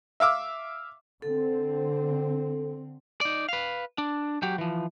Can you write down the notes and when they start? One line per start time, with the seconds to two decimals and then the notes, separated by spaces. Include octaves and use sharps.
0.20 E5 F5 D6 E6
1.22 D3 C4 A4
3.21 D#4 D5
3.49 B4 F5
3.98 D4
4.42 F#3 G4
4.58 E3 F3